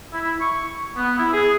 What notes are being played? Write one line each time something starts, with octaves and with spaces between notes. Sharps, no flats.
E4
C#6
B3
E4
G#4